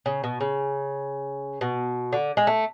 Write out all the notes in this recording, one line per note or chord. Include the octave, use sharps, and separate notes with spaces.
C#3
B2
C#3
B2
D3
G#3
A3